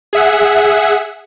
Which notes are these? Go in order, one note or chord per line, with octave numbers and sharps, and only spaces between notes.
G#4 E5 F#5